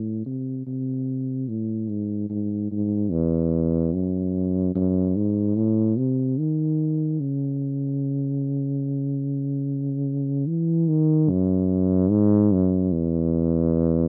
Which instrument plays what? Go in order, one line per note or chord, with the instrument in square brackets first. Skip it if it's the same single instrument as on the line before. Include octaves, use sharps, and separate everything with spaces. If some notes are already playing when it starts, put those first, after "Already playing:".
Already playing: [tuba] A2
C3
C3
A2
G#2
G#2
G#2
E2
F#2
F#2
G#2
A2
C3
D#3
C#3
E3
D#3
F#2
G#2
F#2
E2